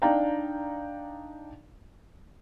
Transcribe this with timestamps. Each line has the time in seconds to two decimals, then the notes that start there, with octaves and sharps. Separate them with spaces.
0.02 D4 D#4 D5 F5 G5 A#5